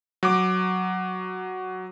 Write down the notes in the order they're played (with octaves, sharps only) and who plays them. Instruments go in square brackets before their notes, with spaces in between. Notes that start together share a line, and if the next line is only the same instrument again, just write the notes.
[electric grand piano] F#3 D6